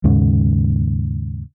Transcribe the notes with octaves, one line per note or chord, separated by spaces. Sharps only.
D#2 G#2 C#3